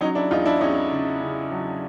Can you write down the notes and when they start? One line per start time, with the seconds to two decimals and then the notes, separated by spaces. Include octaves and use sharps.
0.01 F#3 C#4 D#4
0.15 D4 E4
0.31 E2 D#4 F4
0.46 D4 E4
0.60 E2 C#4 D#4
0.91 C#3
1.20 C#3
1.51 F#3